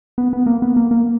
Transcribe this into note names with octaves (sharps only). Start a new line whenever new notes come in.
B3
B3
A#3
B3
A#3
A#3